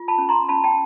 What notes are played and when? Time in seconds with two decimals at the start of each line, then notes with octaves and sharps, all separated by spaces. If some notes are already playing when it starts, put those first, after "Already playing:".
Already playing: F4
0.08 A5 B5
0.18 C#4
0.29 A#5 C6
0.49 C#4 A5 B5
0.64 G5 A5